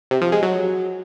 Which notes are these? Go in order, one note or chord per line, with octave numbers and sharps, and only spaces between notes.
C3
F3
G#3
F#3